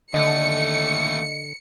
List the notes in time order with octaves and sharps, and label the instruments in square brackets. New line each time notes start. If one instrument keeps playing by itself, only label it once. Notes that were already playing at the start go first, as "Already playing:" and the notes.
[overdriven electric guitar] D#2 A3 [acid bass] D3 [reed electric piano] D#5 [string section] C#7